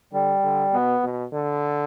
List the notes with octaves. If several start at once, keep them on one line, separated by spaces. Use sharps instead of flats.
D3 G3
D3
B2 B3
B2
D3